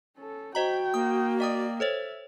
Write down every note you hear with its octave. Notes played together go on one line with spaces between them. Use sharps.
C#4 A4
F#4 C5 D#5 G5 A#5
A#3 D#6
D5 D#5 G5 D#6
A4 C5 C#5 E5